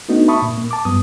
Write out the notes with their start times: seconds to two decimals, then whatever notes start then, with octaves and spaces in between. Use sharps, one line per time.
0.09 A3 B3 D4 D#4 F#4
0.28 E5 A5 B5 C#6 D#6
0.42 A#2
0.58 A#3
0.71 A5 D6
0.85 G2 F#3 B3 D#6